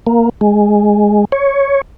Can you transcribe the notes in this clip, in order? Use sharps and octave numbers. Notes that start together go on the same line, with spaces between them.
A#3
G#3
C#5